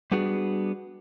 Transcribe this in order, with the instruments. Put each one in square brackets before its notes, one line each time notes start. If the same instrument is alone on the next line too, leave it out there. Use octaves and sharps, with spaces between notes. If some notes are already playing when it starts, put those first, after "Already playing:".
[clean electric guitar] G3 B3 D4 F#4 G#4